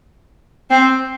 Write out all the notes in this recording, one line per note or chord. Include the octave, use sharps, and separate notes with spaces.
C4